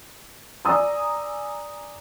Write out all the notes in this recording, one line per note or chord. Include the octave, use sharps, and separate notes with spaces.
D5 G#5 A#5 D#6 E6